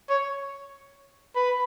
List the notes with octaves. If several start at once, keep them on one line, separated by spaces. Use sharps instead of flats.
C#5
B4